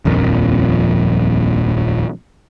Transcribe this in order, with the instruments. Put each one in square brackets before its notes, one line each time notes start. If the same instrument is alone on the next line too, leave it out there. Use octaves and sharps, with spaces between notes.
[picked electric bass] D#1 A#1 F2 A#2